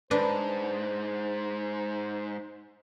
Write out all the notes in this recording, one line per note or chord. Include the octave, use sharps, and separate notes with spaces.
G#2 D4 B4 C5